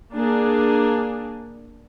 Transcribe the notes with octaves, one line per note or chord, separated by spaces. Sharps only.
A#3 D4 G#4